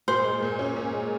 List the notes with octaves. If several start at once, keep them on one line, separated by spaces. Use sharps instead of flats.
A#2 C5
G#3
A#2
C#4
A#2
G#3